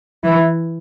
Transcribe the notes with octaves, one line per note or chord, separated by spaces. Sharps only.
E3 E4